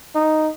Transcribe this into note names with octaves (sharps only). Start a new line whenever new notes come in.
D#4